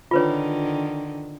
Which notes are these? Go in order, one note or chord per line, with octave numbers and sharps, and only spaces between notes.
D3 D#3 F4 B4 C#5